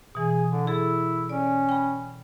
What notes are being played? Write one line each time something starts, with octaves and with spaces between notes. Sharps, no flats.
B2 E3 G#4
D3
E4 G#4 A4
C#4 D5
G5 B5